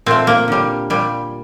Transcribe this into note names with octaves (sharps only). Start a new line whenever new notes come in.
A#2 A3 C4
A#3
D3 G3
A#2 G3